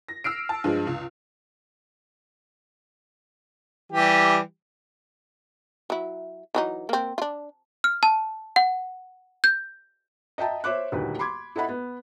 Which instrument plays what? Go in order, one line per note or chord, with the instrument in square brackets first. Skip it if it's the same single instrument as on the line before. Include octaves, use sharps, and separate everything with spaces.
[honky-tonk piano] A#6
E6 F6 C7 D7
A5
G2 F3 G#3
C#2
[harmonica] E3 G3 G4
[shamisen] F#3 E4
E3 F#3 D#4
A#3 C4
D4 F4
[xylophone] F6
A5
F#5
G6
[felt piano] D#5 E5 G5 A5 A#5
C5 C#5 E5 D6 F#6
D#1 D2 D#3 B4
B5 C6 D6 G#6
E4 A4 D#5 F#5 B5
B3